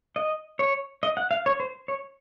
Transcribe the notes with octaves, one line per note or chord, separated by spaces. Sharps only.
D#5
C#5
D#5
F#5
F5
C#5
C5
C#5